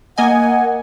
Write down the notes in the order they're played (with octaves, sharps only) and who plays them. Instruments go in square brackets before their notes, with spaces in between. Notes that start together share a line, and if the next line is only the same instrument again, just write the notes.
[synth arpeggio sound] A#3 D#5 G#5 [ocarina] F#5